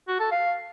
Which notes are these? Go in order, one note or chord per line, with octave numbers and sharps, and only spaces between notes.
F#4
A4
F5